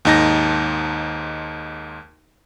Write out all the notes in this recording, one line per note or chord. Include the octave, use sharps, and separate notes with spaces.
D#2 G#2 D#4 A5 A#6